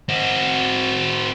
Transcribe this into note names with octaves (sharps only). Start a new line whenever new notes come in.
C4 F#4